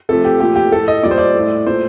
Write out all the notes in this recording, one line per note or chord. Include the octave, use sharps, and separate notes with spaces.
C3 F3 A3 A4
G4
A#2 F3 A3 G4
G4
A2 A3 A4
D#5
A#2 G3 D5
C5
D5
A2 A3
A#2 A3 C5